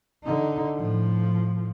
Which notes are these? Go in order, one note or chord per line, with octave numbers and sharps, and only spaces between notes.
D3 D#4
A2 F3